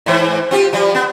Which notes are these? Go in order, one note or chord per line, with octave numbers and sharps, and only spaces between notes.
G#2 E3 C5
C4 F4 G4
F3 G3
B3